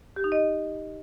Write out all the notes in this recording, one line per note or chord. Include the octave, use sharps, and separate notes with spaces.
G4
D#4
D#5